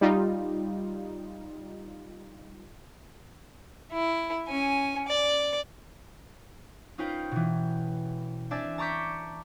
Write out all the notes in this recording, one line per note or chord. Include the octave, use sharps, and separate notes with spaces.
G3 D#4 F4
E4
C#4 G#5
D5
C#4 D#4 F4 B4 C5 G5
B2 E3
C4 D4 D5 E5 G#5 A5
A5 A#5 C#6 D6 G6 B6